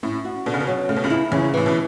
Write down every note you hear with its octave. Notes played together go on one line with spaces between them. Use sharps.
A2 C#4
F#4
B2 D3
C#3
B2
F#3
C#3 A3
B2
C#2 C#3
E4
E2 C#3 E3
A2 E3
B2